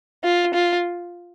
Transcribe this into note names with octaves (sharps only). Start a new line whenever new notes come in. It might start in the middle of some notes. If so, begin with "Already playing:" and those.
F4
F4